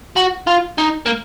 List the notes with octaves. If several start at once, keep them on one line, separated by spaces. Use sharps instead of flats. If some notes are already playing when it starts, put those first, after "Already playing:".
F#4
F4
D#4
A#3